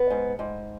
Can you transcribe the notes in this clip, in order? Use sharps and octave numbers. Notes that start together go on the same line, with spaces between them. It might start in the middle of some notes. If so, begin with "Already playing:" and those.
Already playing: B3
G#2
G#2